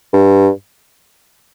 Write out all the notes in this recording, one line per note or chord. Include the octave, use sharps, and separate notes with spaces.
G2